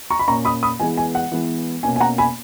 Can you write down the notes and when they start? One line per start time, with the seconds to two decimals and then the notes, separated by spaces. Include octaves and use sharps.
0.10 A#5 C#6
0.19 B5
0.27 A#2 A#3 C#4 A#5 C#6
0.45 B5 D#6
0.63 B5 D#6
0.80 E3 G#3 B3 G#5
0.97 G#5
1.15 F#5
1.32 E3 G#3 B3
1.83 B2 A#3 C#4 G#5
1.96 G#5
2.00 F#5 A#5
2.18 G#5 B5